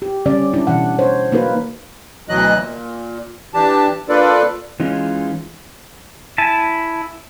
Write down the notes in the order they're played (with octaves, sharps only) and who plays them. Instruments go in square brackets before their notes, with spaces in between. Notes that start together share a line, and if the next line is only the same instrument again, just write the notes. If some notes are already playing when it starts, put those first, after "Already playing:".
[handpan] G4
D3 G3 C#4 D5
D4 E4
B2 E3 F#5
C5 C#5
A#3 D#4 F#4 A#4 B4
[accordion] D2 B2 E3 F#3 D#5 F#6
A#2
E3 D4 G4 A5
A#3 D4 F4 A4 B4 D5
[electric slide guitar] E3 G#3 C#4 D#4 F4
[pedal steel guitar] E4 G#5 A5